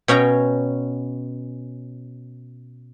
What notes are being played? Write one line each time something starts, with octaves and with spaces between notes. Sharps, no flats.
B2 C#4 G5 A#5